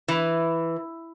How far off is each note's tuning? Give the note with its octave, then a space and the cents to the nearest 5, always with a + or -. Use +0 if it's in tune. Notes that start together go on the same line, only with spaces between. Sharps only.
E3 +5